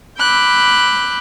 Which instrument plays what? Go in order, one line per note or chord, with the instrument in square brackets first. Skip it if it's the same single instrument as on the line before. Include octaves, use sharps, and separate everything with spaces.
[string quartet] B5 D6 E6 F#6 G6